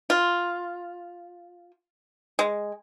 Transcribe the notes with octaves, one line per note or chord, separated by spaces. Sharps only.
F4
G#3